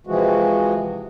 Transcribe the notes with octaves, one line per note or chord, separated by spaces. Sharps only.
C3 E3 F3 G#3 F#4